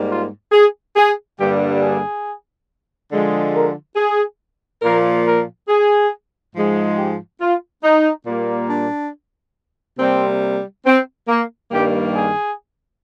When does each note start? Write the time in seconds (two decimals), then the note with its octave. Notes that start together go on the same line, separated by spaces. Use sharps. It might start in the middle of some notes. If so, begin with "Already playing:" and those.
Already playing: G#2 G3 A#3
0.09 F4
0.52 G#4
0.96 G#4
1.38 G2 D3 G3 A#3 G4
1.81 G#4
3.11 D3 F3 G#3
3.53 A#4
3.96 G#4
4.82 A#2 F3 A#3 A#4
5.26 A#4
5.68 G#4
6.55 G#2 F3 G#3
6.97 G4
7.41 F4
7.83 D#4
8.26 A#2 G3 A#3
8.69 D4
9.99 C3 G3 A#3 C4
10.85 C4
11.28 A#3
11.70 G2 D#3 G3 A#3 G4
12.13 G#4